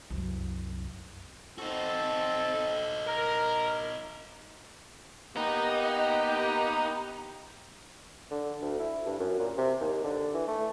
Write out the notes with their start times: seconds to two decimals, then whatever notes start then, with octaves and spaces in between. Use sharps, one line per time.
0.10 C2 F#2
1.58 C4 D#4 F#4 A4
3.07 A#4
5.37 A#3 B3 D#4 G4
8.31 D3
8.61 D2
8.79 E4
9.06 G2
9.20 F#2
9.39 A#2
9.57 C3
9.81 D#2
10.04 D3
10.34 E3
10.47 A3